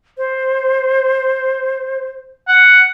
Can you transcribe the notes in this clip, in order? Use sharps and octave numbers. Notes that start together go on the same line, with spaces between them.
C5
F#5